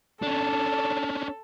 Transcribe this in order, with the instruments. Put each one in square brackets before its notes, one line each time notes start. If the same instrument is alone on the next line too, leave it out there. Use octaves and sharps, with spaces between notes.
[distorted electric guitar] C#4 D4 [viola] A4